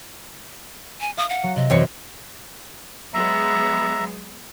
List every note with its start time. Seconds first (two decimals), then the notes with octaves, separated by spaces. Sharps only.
1.01 G#5
1.17 F5 D#6
1.30 F#5
1.44 F#3
1.56 C3 D#5
1.70 F#2 E3 C4 C#5
3.14 F#3 G#3 B3 E5 A#5